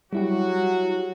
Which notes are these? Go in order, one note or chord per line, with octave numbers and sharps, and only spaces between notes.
F#3 G3 E4 F#4 G4